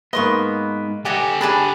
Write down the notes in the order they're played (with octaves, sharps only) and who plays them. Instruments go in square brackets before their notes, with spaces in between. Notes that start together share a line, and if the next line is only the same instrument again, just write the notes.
[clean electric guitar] G#2 B3 [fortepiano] A#3 B4 [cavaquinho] D#5 C6 C#6
[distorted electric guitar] G4 A4 [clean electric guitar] D5 [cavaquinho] D#5 F#5 G#5
[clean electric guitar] D4 [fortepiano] G#4 [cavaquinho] G#5 A5 B5